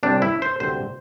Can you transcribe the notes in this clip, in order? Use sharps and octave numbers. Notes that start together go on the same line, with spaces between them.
C2 C3 G3 C4 D4
E4
C5
D2 C3 G3 C4 C5